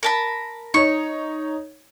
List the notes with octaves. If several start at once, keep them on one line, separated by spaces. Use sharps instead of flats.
A#4 A5 B5
D#4 C#5 C#6